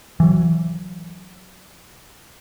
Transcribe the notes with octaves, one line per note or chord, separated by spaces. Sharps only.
E3 F#3